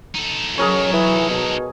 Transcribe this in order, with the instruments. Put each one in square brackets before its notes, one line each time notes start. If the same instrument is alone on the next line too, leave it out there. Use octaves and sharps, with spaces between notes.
[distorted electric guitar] D#4 A4
[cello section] F#3 [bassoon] C#4 [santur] G#4 A#4 C#5
[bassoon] E3
B2